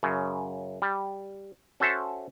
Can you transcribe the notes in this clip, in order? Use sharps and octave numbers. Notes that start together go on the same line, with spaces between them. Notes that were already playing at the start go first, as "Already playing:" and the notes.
F#2 C#3
G3
C#4 F#4 A4 C5 E5 A5